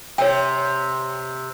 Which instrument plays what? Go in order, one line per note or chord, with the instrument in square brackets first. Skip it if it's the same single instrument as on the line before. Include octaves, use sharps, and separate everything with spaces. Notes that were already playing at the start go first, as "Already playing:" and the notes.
[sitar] C3 [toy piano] C#5 G5